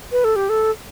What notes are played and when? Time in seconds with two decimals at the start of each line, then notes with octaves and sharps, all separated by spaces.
0.12 B4
0.24 A4
0.36 G4
0.49 A4